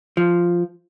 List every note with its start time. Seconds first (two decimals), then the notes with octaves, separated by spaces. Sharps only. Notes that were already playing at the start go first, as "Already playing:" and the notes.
0.17 F3